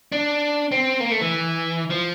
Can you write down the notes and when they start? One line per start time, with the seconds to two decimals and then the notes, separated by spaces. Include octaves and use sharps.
0.12 D4
0.72 C4
1.00 A#3
1.11 A3
1.21 E3
1.90 F3